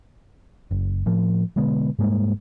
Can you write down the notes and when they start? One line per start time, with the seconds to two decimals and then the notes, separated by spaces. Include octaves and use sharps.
0.71 F#1
1.06 A2 F3
1.56 B2 D3 G#3 B3
1.99 G#2 G3 G#3 A#3